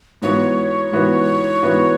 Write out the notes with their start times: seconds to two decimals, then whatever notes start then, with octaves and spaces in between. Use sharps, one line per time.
0.22 G#2 E3 B3 F#4 B4 C#5
0.92 G#2 E3 B3 F#4 B4
1.63 G#2 E3 B3 F#4 B4